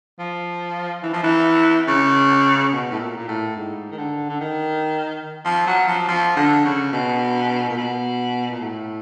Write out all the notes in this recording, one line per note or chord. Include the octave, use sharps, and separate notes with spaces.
F3
E3
F3
E3
C#3
B2
A2
A#2
A#2
A2
G#2
D#3
D3
D3
D#3
F3
F#3
F3
F3
D3
C#3
B2
A#2
B2
A#2
A2